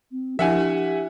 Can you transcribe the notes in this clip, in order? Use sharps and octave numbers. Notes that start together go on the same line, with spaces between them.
C4
F3 D4 E4 G4 E5 F#5 G#5